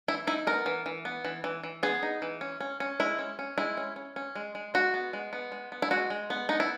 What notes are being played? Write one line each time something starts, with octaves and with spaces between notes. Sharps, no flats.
E3 E4
D#4 E4
B3 A#4
E3
E3
B3
E3
E3
E3
B3 G#4
D#4
E3
C#4
C#4
C#4
G#3 E4
C#4
C#4
G#3 E4
C#4
C#4
C#4
G#3
G#3
G#3 F#4
B3
G#3
B3
G#3
B3
E4
G#3 F#4
G#3
B3
B3 D#4
E4